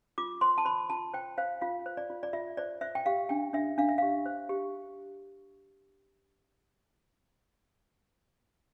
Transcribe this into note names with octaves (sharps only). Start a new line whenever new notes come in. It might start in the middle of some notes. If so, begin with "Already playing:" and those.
F4 D6
C5 C6
A5
C5 B5
F4 A5
C5 G5
C5 F5
F4 F5
C5
D5
F4
D5
F4 E5
C5 D5
C5 E5
G5
G4 F5
D4 G5
D4 E5
D4 F5
E5
G4 F5
C5
G4